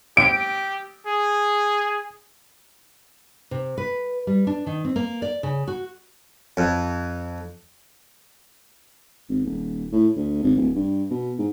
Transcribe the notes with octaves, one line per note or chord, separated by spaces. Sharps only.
G4 D7
G#4
C3
B4
G3
D4
D#3
C4
A#3
D5
C#3
F#4
F2
G#1
D#1
A2
D2
G#1
D1
G2
B2
G#2